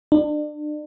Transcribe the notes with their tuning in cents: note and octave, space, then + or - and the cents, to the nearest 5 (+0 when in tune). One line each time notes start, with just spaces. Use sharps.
D4 +35